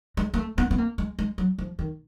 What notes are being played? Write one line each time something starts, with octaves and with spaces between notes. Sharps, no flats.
G#3
A#3
A3
B3
B3
A#3
G#3
G#3
F#3
F3
D#3